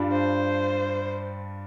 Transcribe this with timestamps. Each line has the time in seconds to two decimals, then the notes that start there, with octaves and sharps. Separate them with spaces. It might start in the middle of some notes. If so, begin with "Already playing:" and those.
Already playing: G2 G3 D4 F4
0.12 C5